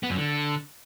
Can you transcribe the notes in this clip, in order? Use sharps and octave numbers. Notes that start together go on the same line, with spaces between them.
B3
F#2
D3